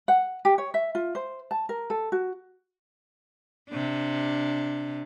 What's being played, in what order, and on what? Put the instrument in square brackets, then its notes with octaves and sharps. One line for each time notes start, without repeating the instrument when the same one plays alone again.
[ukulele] F#5
G4
C#5
E5
F4
C5
A5
A#4
A4
F#4
[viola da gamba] C3 D4